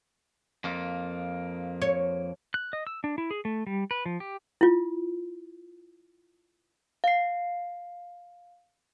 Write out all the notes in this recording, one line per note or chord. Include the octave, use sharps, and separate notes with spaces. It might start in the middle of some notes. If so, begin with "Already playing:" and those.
F2 A#3
C#5
F#6
D#5
E6
D4
E4
G#4
A3
G3
B4
F3
G4
E4 F4
F5 C7